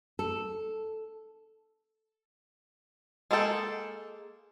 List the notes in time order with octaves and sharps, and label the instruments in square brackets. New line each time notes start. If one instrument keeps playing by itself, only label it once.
[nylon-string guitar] A4
[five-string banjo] G#3 A#3 G#4 A4 G5